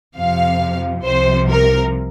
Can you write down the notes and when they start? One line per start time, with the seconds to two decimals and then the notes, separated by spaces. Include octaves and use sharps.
0.16 F2 C3 F3 F5
1.03 C2 C3 F3 C5
1.47 A#4